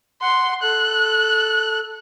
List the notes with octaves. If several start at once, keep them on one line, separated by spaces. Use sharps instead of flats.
F#5 C6
A4 F#6